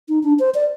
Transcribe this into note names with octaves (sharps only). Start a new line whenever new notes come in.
D#4
D4
C5
D5